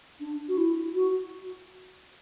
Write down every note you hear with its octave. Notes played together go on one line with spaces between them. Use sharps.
D4
F#4
E4
F#4